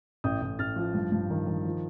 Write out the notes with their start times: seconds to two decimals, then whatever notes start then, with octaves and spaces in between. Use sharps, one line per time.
0.24 A1 D#6 G6
0.42 A1
0.59 A1 F6 A6
0.76 F3
0.94 G2
1.12 G2
1.30 D#3
1.47 D#3
1.65 F3